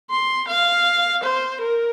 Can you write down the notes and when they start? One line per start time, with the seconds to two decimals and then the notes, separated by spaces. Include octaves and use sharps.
0.10 C6
0.48 F5
1.23 C5
1.61 A#4